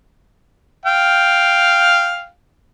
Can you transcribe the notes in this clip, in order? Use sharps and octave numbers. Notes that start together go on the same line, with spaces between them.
F5 G5